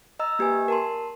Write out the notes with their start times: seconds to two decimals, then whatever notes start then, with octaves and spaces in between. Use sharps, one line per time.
0.19 D#5 A#5 E6
0.39 A#3 G4 B4 G#5
0.68 A#4 A5 C6